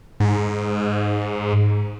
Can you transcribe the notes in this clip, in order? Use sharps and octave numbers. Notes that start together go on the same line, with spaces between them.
G#2